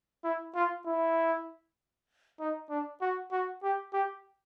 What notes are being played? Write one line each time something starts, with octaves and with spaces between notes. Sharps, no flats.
E4
F4
E4
D#4
D4
F#4
F#4
G4
G4